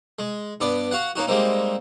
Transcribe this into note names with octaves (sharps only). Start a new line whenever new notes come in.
G#3
G2 B3 D5
F#4 F5 F#5
A#3 C#4 D#4 F#4
G3 G#3 A#3 C4 D#4